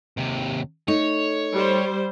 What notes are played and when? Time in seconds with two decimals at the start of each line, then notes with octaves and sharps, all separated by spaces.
0.17 D#2 C3
0.88 A3 D#4 C#5
1.54 G3 C5